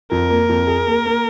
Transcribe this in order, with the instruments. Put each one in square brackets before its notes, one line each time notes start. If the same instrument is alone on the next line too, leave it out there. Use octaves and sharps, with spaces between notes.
[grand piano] F2 [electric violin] A#4
[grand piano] A#3
F2
G#4
A#3
A#3